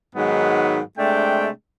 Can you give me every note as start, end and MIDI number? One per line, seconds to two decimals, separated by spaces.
0.15 0.80 44
0.15 0.80 51
0.15 0.80 54
0.15 0.80 56
0.15 0.80 59
0.98 1.49 48
0.98 1.49 56
0.98 1.49 57
0.98 1.49 62
0.98 1.49 79